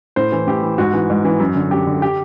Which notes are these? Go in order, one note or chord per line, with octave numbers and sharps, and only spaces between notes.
A2 C5
E3
A2 G4
E3
G#2 F#4
E3
G#2
E3
F#2
D3
F#2 G4
D3
G4